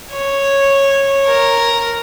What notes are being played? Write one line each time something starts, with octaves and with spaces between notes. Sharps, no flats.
C#5
A#4